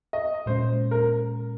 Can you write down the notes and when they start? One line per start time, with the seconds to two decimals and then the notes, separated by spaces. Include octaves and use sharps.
0.13 D#5
0.46 A#2 G#3 C#4 C5
0.91 A#4